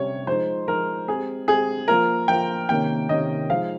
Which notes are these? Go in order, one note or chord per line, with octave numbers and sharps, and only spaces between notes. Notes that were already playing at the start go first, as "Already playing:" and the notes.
Already playing: C3 G3 C#4 C#5
F3 G#3 D#4 C5
F3 G#3 D#4 A#4
G#3 C4 G4 G#4
G#3 C4 G4 G#4
F3 A#3 F4 A#4
F3 A#3 F4 G5
C3 D#3 A#3 C#4 G5
C3 D#3 A#3 C#4 D#5
F3 G#3 D#4 F5